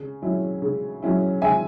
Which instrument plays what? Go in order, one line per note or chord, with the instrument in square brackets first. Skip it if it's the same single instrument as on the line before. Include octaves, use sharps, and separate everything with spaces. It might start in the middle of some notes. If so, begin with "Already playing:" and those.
Already playing: [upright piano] C#3
F#3 C#4 E4
C#3
F#3 C#4 E4
C#3 E5 G#5